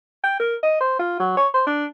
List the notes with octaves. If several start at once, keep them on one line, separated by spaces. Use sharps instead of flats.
G5
A#4
D#5
C5
F4
F#3
C#5
C5
D4